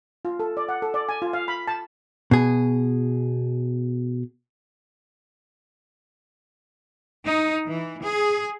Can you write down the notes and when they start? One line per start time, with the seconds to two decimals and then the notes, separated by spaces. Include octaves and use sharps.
0.25 F4
0.40 A4
0.57 D5
0.69 F#5
0.82 A4
0.94 D5
1.09 G#5
1.22 F4
1.33 F5
1.48 B5
1.67 A5
2.31 B2 G#4
7.26 D#4
7.66 E3
8.00 G#4